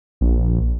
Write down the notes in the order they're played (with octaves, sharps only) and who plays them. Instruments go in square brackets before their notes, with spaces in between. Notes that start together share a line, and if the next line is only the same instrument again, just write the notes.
[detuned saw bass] A#1